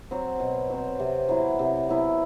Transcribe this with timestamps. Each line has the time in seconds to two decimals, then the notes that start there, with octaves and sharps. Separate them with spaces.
0.11 F#3 C4
0.40 B2
0.70 F#3 C4
1.00 C3
1.29 F#3 B3 E4
1.59 C3
1.89 F#3 B3 E4